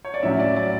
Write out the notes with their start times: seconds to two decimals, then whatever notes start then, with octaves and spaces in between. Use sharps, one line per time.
0.05 C#5
0.14 D5
0.23 A2 F#3 C#4 E5
0.40 D5
0.56 D5